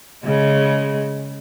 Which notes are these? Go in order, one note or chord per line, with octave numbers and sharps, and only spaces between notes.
C#3 G#3